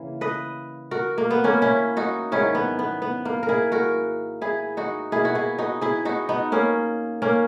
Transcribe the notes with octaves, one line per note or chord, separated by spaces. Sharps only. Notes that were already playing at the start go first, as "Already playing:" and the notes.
Already playing: C#3 E3 A#3
B4 D#5
F#4 A#4
A#3
B3
A#3 C#4
C#4 E4
D#4 F#4
G#2 D#3 F#3 C#4 E4
B3
B3
B3
A#3
A#4
E4 G#4
F#4 A#4
E4 G#4
D#4 F#4
B2 A#3 E4 G#4
F#4
E4 G#4
D#4 F#4
E4 G#4
D#4 F#4
B3 D#4
A#3 C#4
A#3 C#4